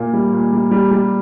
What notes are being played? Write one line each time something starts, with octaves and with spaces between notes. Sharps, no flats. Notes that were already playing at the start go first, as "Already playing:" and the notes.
Already playing: A#2 A#3
G3
A#2
G3
G3
G3